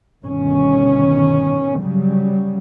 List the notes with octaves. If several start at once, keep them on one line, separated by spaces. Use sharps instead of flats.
G1 B2 D#3 C#4
C#3 F#3 G3